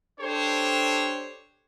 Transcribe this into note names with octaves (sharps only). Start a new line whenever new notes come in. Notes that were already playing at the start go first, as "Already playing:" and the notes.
D4 G4 A4 C5 C#5